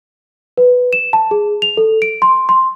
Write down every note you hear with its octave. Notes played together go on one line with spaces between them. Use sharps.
B4
E7
A5
G#4
F7
A4
D7
C6
C6